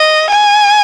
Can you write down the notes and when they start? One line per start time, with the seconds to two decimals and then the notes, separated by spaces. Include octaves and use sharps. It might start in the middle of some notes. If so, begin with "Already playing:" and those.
Already playing: D#5
0.30 G#5